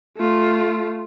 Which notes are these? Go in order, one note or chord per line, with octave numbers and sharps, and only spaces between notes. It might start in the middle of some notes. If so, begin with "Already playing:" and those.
A3 F4